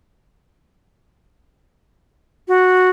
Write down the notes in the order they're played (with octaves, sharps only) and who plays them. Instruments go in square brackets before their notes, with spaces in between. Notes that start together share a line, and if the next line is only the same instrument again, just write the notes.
[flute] F#4